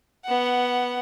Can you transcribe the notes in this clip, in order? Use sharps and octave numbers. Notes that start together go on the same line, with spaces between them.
B3 F#5